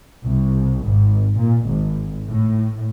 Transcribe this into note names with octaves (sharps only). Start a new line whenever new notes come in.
C2
G#1
A#2
G#1
A2